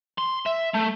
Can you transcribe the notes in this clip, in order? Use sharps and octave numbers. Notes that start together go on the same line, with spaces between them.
C6
E5
A3